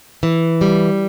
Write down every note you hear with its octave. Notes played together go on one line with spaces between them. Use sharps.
E3
G3